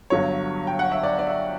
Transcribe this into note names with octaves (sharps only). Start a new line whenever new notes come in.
G1 G2 D3 F#3 C#5
G5
F#5
E5
D5
D5
E5